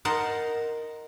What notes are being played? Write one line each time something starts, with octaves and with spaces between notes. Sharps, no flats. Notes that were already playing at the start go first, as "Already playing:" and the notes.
D#4 A#4 F#5 A5 C6